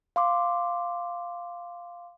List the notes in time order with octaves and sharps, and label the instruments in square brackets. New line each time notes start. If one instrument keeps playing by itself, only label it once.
[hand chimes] F5 C6 D6